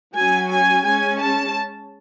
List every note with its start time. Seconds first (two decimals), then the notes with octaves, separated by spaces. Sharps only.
0.16 F#3 C#4 G#5
0.51 G#5
0.85 G#3 C#4 G#5
1.19 A5